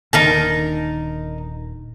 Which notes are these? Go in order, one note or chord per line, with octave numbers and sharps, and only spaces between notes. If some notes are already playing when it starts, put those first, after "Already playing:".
D#1 D3 D#3 D#4 A#4 A5